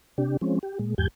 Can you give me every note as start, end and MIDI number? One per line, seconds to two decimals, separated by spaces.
0.18 0.37 48
0.18 0.37 62
0.18 0.37 67
0.41 0.59 53
0.41 0.59 56
0.41 0.59 60
0.41 0.59 61
0.63 0.78 67
0.79 0.94 46
0.79 0.94 56
0.98 1.08 40
0.98 1.08 44
0.98 1.08 67
0.98 1.08 80
0.98 1.08 91